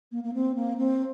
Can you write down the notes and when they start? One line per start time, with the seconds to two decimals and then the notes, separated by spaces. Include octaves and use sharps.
0.12 A#3
0.24 A#3
0.34 C4
0.55 A#3
0.77 C4